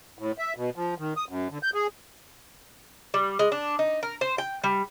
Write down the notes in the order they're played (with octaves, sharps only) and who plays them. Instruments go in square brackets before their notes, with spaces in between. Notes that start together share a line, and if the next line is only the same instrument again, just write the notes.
[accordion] A2
E5
B2
F3
D#3
D#6
F#2
D3
G6
G#4
[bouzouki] G3
G#3
D4
D#4
A#4
C5
G5
G3